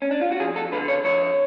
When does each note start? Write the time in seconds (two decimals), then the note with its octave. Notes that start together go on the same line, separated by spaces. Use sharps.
0.02 C#4
0.11 D4
0.21 F4
0.32 F#4
0.40 F2 G#4
0.56 A4
0.72 D3 B4
0.88 C#5
1.04 F2 C#5